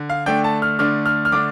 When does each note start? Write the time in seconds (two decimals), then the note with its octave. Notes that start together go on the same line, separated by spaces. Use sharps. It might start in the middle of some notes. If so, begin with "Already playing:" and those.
Already playing: D3
0.10 F5
0.26 D3 A3 D4 G5
0.44 A5
0.62 F6
0.79 D3 A3 D4 F6
1.06 F6
1.25 F6
1.32 D3 A3 D4 D6